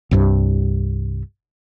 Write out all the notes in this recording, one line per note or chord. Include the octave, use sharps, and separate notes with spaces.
C2 G2 C3